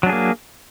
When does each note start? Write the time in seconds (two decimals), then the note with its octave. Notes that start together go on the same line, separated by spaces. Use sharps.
0.03 F#3
0.06 D4
0.09 G#4
0.12 A#3